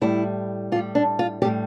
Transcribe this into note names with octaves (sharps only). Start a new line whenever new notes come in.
A2 G3 E4
A2 G3 F4
D4
F4
A2 G3 G4